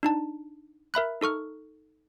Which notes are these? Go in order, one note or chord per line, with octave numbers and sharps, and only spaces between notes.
D4 D#4 A5
A#4 E5 B5 F#6
D#4 A4 C#6 F6